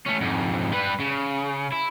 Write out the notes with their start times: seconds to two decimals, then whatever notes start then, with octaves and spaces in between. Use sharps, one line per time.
0.06 A3 C#4
0.21 F2 G#2
0.73 G3 B4
1.00 C#3
1.72 E4